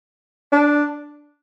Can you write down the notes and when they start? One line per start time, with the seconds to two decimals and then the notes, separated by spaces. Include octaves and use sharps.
0.52 D4